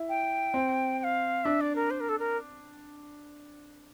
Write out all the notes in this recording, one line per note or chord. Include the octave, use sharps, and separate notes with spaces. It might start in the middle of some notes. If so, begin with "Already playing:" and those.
Already playing: E4
G5
C4
G5
F5
D4 E5
D5
A#4
C5
A#4
A4
A#4